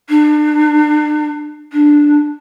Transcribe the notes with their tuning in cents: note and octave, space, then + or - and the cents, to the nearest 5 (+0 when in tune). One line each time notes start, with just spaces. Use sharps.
D4 +35
D4 +5